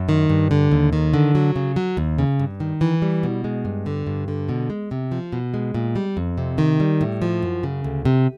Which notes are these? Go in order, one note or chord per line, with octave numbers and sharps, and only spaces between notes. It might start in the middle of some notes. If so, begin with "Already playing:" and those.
Already playing: F#2
D#3
G2
D3
D#2
D#3
D3
F#3
C#3
F#3
D#2
C#3
G2
D#3
E3
G3
B2
G#3
G2
D3
G2
D3
B2
G#3
C3
F3
B2
G#3
A#2
G3
F2
C3
D#3
G3
A2
F3
F#2
C#3
D2
C3